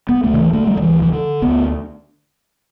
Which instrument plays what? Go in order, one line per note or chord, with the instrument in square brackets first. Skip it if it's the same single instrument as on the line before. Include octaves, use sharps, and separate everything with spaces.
[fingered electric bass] B3
D2 A3
D3
E3
D3 A3
G3
G3
D2 E3
E3
D3
D2 B3